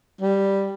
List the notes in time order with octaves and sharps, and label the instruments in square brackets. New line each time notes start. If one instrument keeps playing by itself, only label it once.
[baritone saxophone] G3